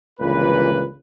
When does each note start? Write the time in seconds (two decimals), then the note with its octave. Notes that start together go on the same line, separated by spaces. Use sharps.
0.20 G1 C#2 A#2 E3 B4